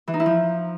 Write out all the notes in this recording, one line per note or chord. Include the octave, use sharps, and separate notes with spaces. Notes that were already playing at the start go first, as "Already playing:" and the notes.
E3
D#4
E4
F3